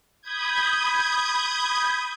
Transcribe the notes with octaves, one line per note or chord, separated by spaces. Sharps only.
B5 D#6 G6 G#6